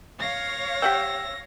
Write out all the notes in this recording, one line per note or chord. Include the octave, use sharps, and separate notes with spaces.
C#5 F5 A#6
G4 F#5 G5 E6